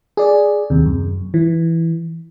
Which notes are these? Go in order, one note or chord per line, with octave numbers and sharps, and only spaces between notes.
G#4 D5
D#2 C3
F#2
E3